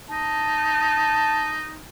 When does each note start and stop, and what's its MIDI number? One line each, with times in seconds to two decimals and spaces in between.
0.10 1.83 63
0.10 1.56 81